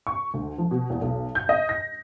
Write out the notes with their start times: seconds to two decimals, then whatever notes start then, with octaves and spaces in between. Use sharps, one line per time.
0.07 C#6
0.34 D2
0.58 F3
0.71 B2
0.90 E2
1.01 B1
1.35 G6
1.49 D#5
1.69 A#6